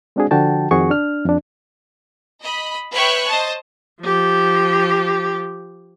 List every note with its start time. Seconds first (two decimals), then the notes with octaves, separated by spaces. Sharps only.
0.16 G#3 C4 D4 F#4 G#4
0.31 D3 F3 F#4 G5 A5
0.71 F2 D#3 C4 F#4 G#4 C#6
0.90 D4 F6
1.25 F2 D4
2.42 D#5 B5
2.93 B4 C#5 E5 G5 C#6 F#6
3.28 C5 D#5 A5
4.02 F3 G4